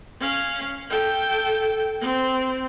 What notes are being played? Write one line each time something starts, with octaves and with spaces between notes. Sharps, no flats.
C#4 F5
A4 G5
C4